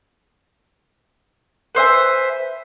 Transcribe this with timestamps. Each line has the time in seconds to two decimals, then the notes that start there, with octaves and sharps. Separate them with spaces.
1.75 B4 C5 E5 G#5